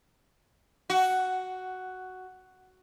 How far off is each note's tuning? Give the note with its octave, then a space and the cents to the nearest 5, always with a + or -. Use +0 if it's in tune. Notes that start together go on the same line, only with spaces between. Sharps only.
F#4 +5